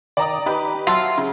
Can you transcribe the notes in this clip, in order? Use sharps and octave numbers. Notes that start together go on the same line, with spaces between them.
D#3 D5 A#5 D#6
D#4 G4 B4
F#3 F4 E5 F#5 A5
C#3